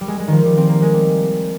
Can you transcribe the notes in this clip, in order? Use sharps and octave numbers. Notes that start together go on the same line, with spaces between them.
G3
G#3
G#3
D#3 F3
G3
C4
A#3
G#3
G3